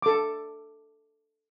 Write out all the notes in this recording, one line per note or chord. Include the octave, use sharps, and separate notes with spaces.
A4 D6